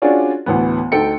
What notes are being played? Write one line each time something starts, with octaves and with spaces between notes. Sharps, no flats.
C#4 D4 F4 F#4 G#4 D5
D2 A2 E3 B3
D2 D#4 A4 G5 C#7